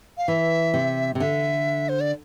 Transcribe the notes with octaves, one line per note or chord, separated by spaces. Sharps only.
F5
E3 E5
C3
C3
D3 E5
C5
D5